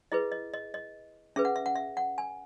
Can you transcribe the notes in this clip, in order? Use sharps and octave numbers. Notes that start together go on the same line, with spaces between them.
E4 G#4 B4 D#5
D#5
D#5
D#5
C#4 G#4 B4 E5
F#5
E5
F#5
E5
F#5
G#5